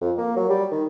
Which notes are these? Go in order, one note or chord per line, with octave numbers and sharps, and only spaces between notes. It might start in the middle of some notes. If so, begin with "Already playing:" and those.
F2
A#3
F#3
G3
D#3